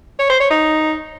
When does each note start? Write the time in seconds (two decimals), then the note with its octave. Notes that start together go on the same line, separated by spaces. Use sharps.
0.19 C#5
0.29 C5
0.40 C#5
0.50 D#4